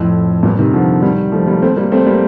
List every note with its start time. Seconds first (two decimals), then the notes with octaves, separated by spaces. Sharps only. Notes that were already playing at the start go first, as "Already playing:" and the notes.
Already playing: F2 A2
0.43 G2 A#2
0.59 C3 D#3
0.73 D3 F3
1.02 D#3 G3
1.32 F3 A3
1.47 G3 A#3
1.62 A3 C4
1.77 G3 A#3
1.92 A3 C4
2.07 G3 A#3